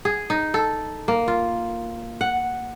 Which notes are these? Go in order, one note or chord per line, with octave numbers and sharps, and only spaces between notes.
G#4
D#4
A4
A#3
F4
F#5